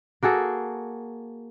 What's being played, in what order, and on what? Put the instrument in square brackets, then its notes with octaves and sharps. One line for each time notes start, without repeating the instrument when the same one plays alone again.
[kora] A#3 F#4 G#4 A4